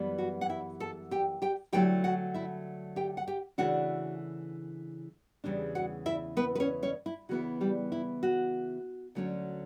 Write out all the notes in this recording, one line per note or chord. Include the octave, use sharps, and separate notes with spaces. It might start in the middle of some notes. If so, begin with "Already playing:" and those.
Already playing: F#2 E3 G3 B3
F#4
F#5
E4 E5
A4 A5
G4 G5
G4 G5
D3 F#3 A3 E4 G4 G5
F#4 F#5
E4 E5
G4 G5
F#5
G4 G5
C#3 E3 A3 D4 F#4 F#5
E2 C#3 E3 G3 D4
F#4 F#5
E4 E5
B3 B4
B4
C#4 C#5
C#4 C#5
E4
C#3 E3 B3 E4 F#4
G3 G4
E4
F#4
D2 D3 F#3 A3 C#4